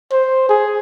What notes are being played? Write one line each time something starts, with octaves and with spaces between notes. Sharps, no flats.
C5
G#4